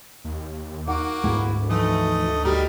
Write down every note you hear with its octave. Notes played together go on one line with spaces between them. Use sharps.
D#2
A#3 D#4 F#4 F#5 D6
D2 G#2 G#3 B3 E4 F#5
E3 F3 A3 D#4 D#5
D#3 G3 D#4 F#4 G4 A4